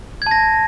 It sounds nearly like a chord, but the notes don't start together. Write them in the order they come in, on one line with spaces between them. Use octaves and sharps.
G#6 A5 A#6